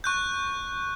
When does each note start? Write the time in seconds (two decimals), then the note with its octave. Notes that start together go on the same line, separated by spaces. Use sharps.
0.04 C#6 F#6 G6